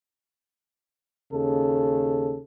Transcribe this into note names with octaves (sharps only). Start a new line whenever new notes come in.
D#2 C#3 A4